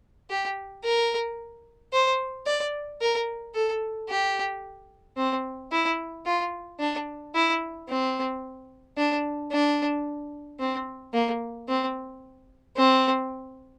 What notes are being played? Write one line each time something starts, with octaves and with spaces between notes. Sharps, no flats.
G4
A#4
C5
D5
A#4
A4
G4
C4
E4
F4
D4
E4
C4
D4
D4
C4
A#3
C4
C4